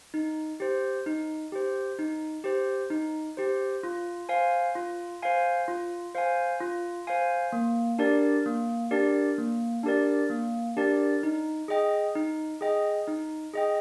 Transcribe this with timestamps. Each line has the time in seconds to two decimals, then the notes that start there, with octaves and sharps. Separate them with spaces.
0.14 D#4
0.60 G4 C5
1.06 D#4
1.52 G4 C5
1.99 D#4
2.44 G4 C5
2.90 D#4
3.37 G4 C5
3.83 F4
4.29 C5 F5 G#5
4.75 F4
5.22 C5 F5 G#5
5.68 F4
6.15 C5 F5 G#5
6.61 F4
7.07 C5 F5 G#5
7.53 A#3
7.99 D4 G4 A#4 D5
8.46 A#3
8.91 D4 G4 A#4 D5
9.38 A#3
9.83 D4 G4 A#4 D5
10.30 A#3
10.77 D4 G4 A#4 D5
11.23 D#4
11.68 G#4 D#5 G5
12.15 D#4
12.61 G#4 D#5 G5
13.07 D#4
13.54 G#4 D#5 G5